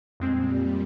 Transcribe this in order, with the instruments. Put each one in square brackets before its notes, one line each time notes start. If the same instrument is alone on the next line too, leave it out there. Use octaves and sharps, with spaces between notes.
[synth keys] F2 G#3 C4 [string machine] A#2 G3